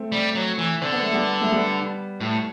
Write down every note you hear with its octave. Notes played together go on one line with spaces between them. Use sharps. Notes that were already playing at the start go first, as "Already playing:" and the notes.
Already playing: A3 C4
G3
F#3
E3
D3 C4
B3
A3
G3 B3
A3
G3 B3
A2